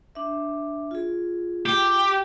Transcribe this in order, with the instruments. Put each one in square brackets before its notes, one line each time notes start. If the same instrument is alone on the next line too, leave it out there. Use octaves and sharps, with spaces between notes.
[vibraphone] D4 E5
F4 G#4
[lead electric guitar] G4